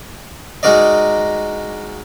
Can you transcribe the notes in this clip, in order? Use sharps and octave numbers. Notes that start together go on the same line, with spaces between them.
G#3 D#4 F#4 A#4 D5 D#5